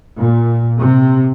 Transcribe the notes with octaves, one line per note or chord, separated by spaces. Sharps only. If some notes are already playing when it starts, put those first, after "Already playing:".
A#2
C3